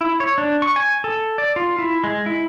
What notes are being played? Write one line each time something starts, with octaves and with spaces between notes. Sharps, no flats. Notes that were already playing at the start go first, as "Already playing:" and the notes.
E4
C#5
D4
C#6
G#5
A4
D5
F4
E4
G#3
E4